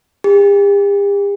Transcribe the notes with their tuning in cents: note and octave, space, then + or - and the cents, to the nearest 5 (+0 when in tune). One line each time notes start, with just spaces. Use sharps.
G4 +45